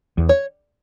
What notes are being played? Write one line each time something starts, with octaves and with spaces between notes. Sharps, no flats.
E2
C#5